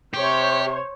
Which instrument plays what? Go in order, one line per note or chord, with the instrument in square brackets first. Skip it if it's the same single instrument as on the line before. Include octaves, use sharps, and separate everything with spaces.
[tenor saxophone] C3 [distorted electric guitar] G4 [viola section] C5 C#5